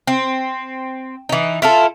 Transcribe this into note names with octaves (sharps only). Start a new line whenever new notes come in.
C4
E3 D#4
E4 F4 A4